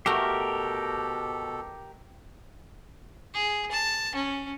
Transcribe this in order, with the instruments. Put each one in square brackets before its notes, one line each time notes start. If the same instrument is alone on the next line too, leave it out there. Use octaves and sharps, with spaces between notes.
[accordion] B2 A4 [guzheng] A3 F#4 [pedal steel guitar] G4 A#4
[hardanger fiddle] G#4
A5
C#4